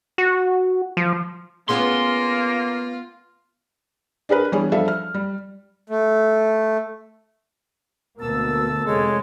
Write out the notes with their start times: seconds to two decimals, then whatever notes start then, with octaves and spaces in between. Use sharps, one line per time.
0.18 F#4
0.97 F3
1.69 A#3 B3 C#4 F4 G#4 C6
4.29 D4 G#4 A#4 B4
4.52 E3 G3 B3 D4 G#4 C#5
4.72 F3 G3 D4 A4 E5 F5
4.88 F6
5.14 G3
5.90 A3
8.19 D2 B2 A#3 A5 E6
8.86 F1 G#3 A4 C#5